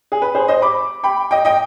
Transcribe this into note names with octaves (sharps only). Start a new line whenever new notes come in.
G#4
B4
G#4 C5
C5 D#5
B5 D6
G5 B5
D#5 G5
D#5 G5